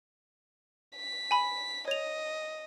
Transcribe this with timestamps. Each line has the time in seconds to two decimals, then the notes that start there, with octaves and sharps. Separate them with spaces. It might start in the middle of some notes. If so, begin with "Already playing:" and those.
0.96 B6
1.31 G#5 B5
1.88 C#5 D#5 F7